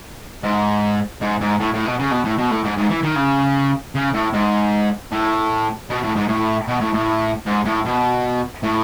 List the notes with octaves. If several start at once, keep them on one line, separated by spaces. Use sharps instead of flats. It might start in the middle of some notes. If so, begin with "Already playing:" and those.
G#2
G#2
G#2
A2
A2
B2
C#3
B2
A2
B2
A2
G#2
G#2
E3
D#3
C#3
C#3
A2
G#2
A2
B2
A2
G#2
A2
B2
A2
A2
G#2
A2
B2
A2